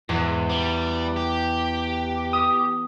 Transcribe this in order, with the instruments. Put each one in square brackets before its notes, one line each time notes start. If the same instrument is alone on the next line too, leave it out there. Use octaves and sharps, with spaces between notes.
[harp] E2 [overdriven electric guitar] G#2
[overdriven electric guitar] G3
G4
[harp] D#6